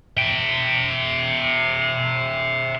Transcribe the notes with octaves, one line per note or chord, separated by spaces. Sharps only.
E5 G5